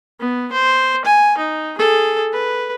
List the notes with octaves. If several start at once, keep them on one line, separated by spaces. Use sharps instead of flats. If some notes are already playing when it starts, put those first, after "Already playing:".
B3
C5
G#5
D#4
G#4 A4
B4